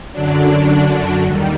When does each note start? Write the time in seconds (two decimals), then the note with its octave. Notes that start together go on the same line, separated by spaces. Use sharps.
0.12 F#2 D3 F#3 D4
1.27 D#2 D#3 G3